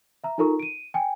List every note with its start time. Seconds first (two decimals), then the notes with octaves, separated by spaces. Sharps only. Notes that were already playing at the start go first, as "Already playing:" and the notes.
0.24 E5 A#5
0.38 D#4 F4 A4 A#4 A#5 C#6
0.60 D7 D#7
0.94 G5 G#5